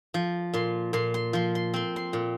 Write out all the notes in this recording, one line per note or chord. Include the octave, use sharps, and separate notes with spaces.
F3
A#2 C6
A#2 C6
C6
F3 C6
C6
C4 C6
C6
A#2